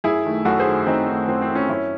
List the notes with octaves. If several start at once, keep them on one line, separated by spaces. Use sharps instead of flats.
F#2 E4 G#4
D#3 A3
F#2 F#4 A4
G#4 C5
D#3 A3
F#2 C4 D#4
D#3 A3
F#2 C4
C4
D#3 A3
C#4
F#2 C#4 E4